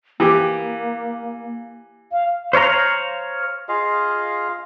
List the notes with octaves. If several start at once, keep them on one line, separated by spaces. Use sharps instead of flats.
E3 A#3 G4 D6
F5
C5 C#5 F5 A#5
F4 G#4 D#5 F5